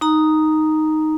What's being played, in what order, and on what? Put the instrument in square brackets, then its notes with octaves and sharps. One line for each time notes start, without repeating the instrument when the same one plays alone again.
[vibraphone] D#4 A#5